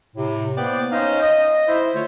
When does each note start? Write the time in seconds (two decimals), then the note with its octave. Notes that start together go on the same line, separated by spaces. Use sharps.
0.16 A2 C3
0.57 A#3 B3 B4 C5 D5 G5
0.92 C#4 D#4 C5 C#5 D#5 F5
1.22 D#5
1.68 E4 C5 E5
1.94 D3 A3 F4 C#5